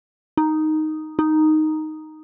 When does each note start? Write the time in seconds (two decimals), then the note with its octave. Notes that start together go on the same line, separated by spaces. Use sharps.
0.37 D#4
1.19 D#4